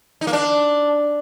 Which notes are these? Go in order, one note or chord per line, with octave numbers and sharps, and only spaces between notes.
D#4
A#3
D4